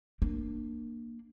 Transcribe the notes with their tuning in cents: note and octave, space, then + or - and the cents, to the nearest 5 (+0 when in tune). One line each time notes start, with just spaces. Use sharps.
A#3 +0 D4 +20